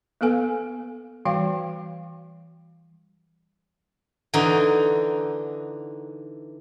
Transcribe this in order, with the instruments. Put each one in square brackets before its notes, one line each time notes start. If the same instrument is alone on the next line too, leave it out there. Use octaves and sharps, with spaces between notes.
[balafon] A#3 B3 A4 B4 G#5
E3 G3 F#4 F5 G5
[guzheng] D3 E3 D#4 F#4